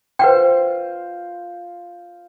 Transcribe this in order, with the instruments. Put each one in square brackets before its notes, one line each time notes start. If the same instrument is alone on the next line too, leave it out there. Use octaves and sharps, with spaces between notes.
[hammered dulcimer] F4 C5 [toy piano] B4 F#5 G5